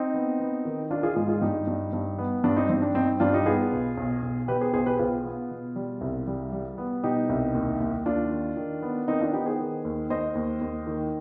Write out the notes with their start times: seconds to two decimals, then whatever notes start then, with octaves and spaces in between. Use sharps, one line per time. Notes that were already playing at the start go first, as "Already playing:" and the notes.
Already playing: C4 D#4
0.14 B3
0.40 B3
0.65 D#3
0.91 D#3 D4 F4
1.03 F4 G#4
1.16 G#2 F4 G#4
1.29 F4 G#4
1.41 G2 D#4 G4
1.67 G2
1.93 G2
2.18 B3
2.44 G2 D4
2.56 C4 D#4
2.69 G2 C4
2.82 D4
2.95 G2 C4 D#4
3.20 G2 D4 F4
3.33 D#4 G4
3.46 B3 F4 G#4
3.72 B1
3.97 B1
4.22 B1
4.48 B2 G4 B4
4.61 G#4 C5
4.74 B1 G#4 C5
4.86 G4 B4
4.99 B1 F4 G#4
5.25 B3
5.51 B2
5.76 G3
6.01 C2
6.27 G3
6.52 G3
6.78 B3
7.03 B2 D#4 G4
7.29 C2
7.55 D#2
7.80 D#2
8.06 D#2 D4 F4
8.31 D#3
8.57 D#3
8.82 B3
9.08 D#3 C4 D#4
9.21 D4 F4
9.33 B3 D#4 G4
9.46 G#4 C5
9.59 D#3
9.85 D#2
10.10 D#2 C5 D#5
10.35 D#2
10.61 D#2
10.87 D#3